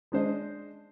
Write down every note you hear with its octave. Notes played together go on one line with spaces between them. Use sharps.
G#3 D4 C5 D#5